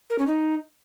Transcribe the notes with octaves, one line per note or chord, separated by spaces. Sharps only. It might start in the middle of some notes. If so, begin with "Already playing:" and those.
A#4
C#4
D#4